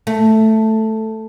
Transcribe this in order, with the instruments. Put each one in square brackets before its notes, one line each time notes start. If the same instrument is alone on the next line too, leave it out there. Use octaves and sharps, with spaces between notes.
[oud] A3